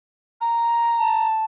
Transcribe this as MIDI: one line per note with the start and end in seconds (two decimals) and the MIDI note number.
0.41 1.27 82
0.99 1.44 81